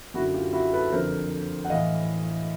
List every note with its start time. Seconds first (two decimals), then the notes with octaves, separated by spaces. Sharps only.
0.14 F#2 E4 F#4
0.18 D3
0.34 F4 G4
0.53 E4 F#4
0.73 A4 B4
0.92 F2 D3 A#4 C5
1.65 F#5
1.70 A2 E3 D#5 F5